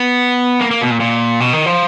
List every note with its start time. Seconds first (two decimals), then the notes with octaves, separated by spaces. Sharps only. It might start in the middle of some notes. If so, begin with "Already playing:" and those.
Already playing: B3
0.61 A#3
0.71 A#3
0.81 B2
0.90 A#2
1.01 A#2
1.40 B2
1.53 D#3
1.66 F3